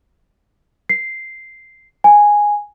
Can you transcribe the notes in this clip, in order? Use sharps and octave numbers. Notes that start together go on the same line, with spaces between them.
C7
G#5